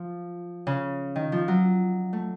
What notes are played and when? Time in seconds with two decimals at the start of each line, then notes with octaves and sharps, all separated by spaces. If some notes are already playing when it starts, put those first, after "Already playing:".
Already playing: F3
0.67 C#3
1.16 D#3
1.32 F3
1.48 F#3
2.13 A3